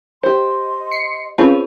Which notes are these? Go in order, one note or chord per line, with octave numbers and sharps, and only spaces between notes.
G4 C5 D#5 C6
C7 C#7
C4 C#4 F4 G#4 B4 G#5 A5